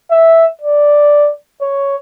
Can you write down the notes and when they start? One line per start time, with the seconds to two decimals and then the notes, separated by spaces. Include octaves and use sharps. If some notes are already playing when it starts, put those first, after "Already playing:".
0.11 E5
0.61 D5
1.61 C#5